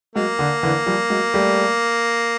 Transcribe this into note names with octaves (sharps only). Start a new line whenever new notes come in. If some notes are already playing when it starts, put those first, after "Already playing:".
F#3 G#3 A#3
D3
D3 E3
F3 G3
F#3 G#3
G3 A3